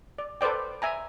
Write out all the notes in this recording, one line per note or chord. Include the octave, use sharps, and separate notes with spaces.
D5
A4 B4 C5 D5 G5
E5 G#5 A#5